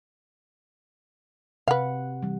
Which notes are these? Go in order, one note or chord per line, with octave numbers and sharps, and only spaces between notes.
C3 B4 F5 F#5
E3 G3